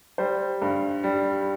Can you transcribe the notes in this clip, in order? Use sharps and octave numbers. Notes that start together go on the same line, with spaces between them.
G3 C5
G2
G3